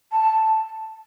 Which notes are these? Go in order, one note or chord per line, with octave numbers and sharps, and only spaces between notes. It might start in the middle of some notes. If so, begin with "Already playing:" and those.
A5